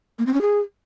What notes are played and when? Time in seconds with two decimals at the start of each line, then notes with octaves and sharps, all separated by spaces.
0.19 A#3
0.26 C4
0.34 C#4
0.41 G#4